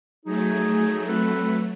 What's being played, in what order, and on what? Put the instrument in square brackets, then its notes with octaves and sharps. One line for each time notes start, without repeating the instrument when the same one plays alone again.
[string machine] F#3 A3 [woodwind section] D#4 G#4
[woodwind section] C4 A4 B4